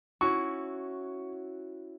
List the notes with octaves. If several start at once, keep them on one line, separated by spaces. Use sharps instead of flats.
C#4 E4 F#4 C#6